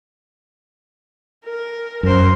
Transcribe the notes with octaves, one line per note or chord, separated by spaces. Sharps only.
A#4
F#2 A#4 C5